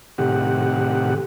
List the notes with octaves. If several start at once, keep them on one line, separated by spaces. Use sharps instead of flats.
A2 C3 D#3 G4 F#5